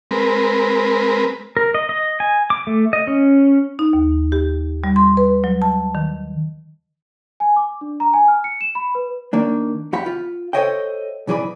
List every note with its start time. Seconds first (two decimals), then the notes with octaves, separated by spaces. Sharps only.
0.11 G#3 C4 A#4 B4
1.57 A#4
1.74 D#5
1.89 D#5
2.20 G#5
2.50 D6
2.67 A3
2.93 D#5
3.07 C#4
3.79 D#4
3.93 D#2
4.32 G4
4.84 G3
4.96 C6
5.17 B4
5.44 F#3
5.62 A5
5.95 D#3
7.40 G#5
7.56 D6
7.81 D4
8.00 A#5
8.14 G#5
8.28 F6
8.44 C#7
8.61 E7
8.75 B5
8.95 B4
9.33 D#3 A#3 D4
9.93 E2 G4 F#5 B5
10.06 F4
10.53 A4 C5 C#5 D#5 E5 G5
11.27 B1 G#2 E3 G#4 D5 B5